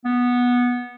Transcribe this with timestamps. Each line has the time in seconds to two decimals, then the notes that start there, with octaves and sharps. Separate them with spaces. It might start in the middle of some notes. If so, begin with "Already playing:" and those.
0.05 B3